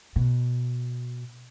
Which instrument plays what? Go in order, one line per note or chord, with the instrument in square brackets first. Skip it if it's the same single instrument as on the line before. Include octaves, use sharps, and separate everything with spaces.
[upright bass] B2